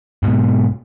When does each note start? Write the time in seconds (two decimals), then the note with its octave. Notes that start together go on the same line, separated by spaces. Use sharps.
0.23 G#2 B2